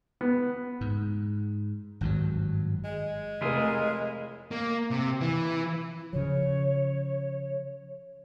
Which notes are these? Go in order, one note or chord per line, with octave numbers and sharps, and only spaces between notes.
B3
G#2
G#1 G2 C3 F#3
G#3
F1 E4 F4 G#4 A#4
A#3
C3
E3
C#3 F3 C#5